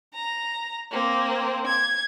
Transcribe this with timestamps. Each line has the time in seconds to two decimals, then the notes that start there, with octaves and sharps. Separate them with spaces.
0.14 A#5
0.91 A#3 C4
1.67 G#6